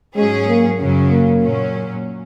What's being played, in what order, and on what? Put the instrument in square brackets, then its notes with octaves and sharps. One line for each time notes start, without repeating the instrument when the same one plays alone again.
[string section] G#2 F#3 C#4 G#4 [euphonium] G#3
[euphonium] A#3
[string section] F#2 C#3 F#3 C#4
[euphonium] A#3
[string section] A#2 F#3 C#4